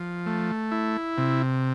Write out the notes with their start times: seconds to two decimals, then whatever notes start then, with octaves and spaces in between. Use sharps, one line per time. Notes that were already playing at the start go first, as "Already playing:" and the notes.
Already playing: F3
0.26 A3
0.72 E4
1.18 C3